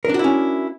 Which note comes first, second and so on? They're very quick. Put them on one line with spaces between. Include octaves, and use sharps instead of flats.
A#4 D4 F#4 E4 C#4